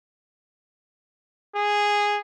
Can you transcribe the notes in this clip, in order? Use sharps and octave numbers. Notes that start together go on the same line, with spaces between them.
G#4